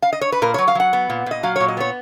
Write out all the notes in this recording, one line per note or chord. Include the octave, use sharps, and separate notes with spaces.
F5
D#5
C#5
B4
A#2 A#4
C#5
F#3
F5
F#3 F#5
B3
A#2
A#2 D#5
F#3 F5
C#5
A#2
D#5
B3 C#5